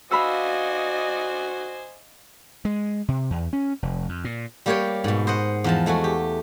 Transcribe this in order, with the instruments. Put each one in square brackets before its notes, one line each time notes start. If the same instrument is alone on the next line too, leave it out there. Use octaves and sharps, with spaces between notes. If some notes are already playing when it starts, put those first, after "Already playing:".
[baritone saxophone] F#4 [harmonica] C5 G#5 [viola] D5 D#5 [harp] F5 B5 E6
[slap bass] G#3
C3
E2
C#4
F1
F2
A#2
[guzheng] G3 A#3 G4 A#4 C#5 G5
G#2 B2
C5 D#5 F#5
E2 F3 A5
G#3 A3 F#4 G#5
G4